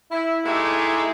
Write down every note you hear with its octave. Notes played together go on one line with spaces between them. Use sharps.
E4
G#3 A3 D#4 E4 G4 G#4